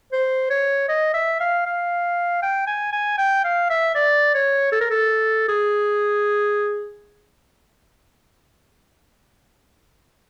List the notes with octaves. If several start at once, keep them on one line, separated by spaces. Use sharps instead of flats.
C5
C#5
D#5
E5
F5
F5
G5
G#5
G#5
G5
F5
E5
D5
C#5
A4
A#4
A4
G#4